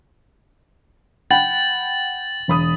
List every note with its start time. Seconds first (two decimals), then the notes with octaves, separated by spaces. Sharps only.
1.31 F#5 G5 B5 A6 F#7
2.48 E1 B5 D#6